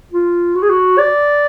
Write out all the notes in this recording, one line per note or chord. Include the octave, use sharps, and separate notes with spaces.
F4
F#4
G#4
F#4
D5